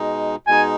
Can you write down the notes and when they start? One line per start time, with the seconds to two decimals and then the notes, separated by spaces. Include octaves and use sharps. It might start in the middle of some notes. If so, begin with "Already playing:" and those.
Already playing: B2 G#3 D#4
0.47 B2 G#3 D#4 G#5